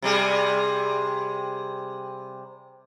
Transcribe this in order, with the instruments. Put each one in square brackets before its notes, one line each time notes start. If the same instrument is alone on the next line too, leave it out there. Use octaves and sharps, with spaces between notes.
[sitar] C3 G3 G#4